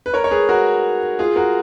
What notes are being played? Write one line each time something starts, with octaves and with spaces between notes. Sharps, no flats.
B4
A#4 C#5
C#5
G#4 B4
F#4 A#4
F4 G#4
F#4 A#4